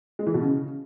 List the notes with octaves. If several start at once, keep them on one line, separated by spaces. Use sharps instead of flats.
G#3
E3
B2
C#3